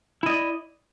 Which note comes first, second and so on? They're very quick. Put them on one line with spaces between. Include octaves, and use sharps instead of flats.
E4 D#5 D5